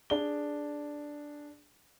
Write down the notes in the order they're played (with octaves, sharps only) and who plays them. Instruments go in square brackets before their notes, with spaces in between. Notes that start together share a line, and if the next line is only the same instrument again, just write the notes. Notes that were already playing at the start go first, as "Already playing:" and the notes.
[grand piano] D4 G#4 G7